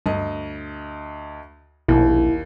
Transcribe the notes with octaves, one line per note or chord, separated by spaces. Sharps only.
D2 G2 D#5
A#1 D#2 B2 E4